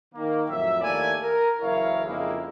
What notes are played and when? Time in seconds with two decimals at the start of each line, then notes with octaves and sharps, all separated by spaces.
0.15 D#3 A#3
0.48 F2 A2 F#3 E5
0.81 D#2 A3 A#3 E4 D5 G#5
1.23 A#4
1.62 F#1 E3 E4 A#4 C#5 F5
2.05 F2 C#3 G#3 A#3 D#4 E4